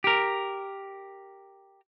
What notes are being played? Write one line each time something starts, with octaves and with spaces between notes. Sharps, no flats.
G4 A#4